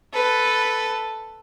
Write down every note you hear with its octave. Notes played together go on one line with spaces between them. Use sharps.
A4 B4